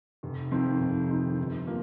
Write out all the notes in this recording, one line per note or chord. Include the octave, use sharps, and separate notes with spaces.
F1
F2 D#3 C4 D#4
F1
F2 D#3 C4 D#4
G1
F3 A#3